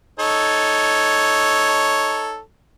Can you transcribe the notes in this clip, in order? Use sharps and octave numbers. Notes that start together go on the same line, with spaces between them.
D#4 A4 C#5